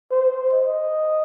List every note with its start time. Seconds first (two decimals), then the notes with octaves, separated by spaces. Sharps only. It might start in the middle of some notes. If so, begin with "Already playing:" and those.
0.11 C5
0.53 D#5